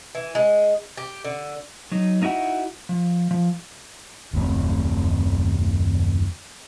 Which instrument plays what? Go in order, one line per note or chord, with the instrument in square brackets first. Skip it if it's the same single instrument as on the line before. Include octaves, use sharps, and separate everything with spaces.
[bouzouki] E3
G#3
G4
D3
[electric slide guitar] F#3 D#4
A#3 D#4 E4 F#4 F#5
F3
F3
[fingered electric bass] F#1 D#2 A3 C4